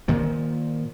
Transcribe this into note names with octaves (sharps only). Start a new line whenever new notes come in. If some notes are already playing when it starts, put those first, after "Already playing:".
A#2 D#3 F3